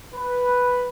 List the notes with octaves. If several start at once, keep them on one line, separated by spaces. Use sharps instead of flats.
B4